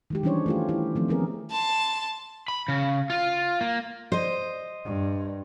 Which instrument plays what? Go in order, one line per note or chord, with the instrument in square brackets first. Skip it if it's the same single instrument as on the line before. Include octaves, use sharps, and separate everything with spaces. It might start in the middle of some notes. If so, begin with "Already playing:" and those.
[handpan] D#3 G#3 G4
E3 G3 C#4 D4 C5 C#5
A3 F4 G4
E4 G4
D#3 F3 A3 C4
B3 C#4 G#4 A#4
[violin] A5 C6
[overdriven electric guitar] B5
C#3
F4
A#3
[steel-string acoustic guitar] C5 D#5
[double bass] G2